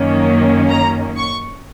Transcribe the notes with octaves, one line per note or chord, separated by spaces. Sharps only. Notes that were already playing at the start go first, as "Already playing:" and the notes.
Already playing: F#2 D#3 A#3 C#4
A#5
C#6